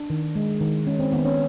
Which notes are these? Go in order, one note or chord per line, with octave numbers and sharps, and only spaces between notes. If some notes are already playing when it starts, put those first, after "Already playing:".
Already playing: D4
D#3
G#3
D#3
G#3 C#4
C4
D#3 B3
C#4